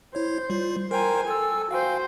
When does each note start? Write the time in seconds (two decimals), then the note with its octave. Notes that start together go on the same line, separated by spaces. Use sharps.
0.15 E4 C5 C#5
0.50 G3 F4
0.91 A#4 C5 G5 G#5 A#5
1.27 A4 G#5 E6
1.71 F#4 C5 F5 G5 G#5